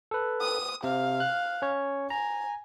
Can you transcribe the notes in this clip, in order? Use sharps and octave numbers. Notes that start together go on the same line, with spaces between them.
A4 B4
D#6
C3 F5
F#6
C#4 C#5
G#5 A#5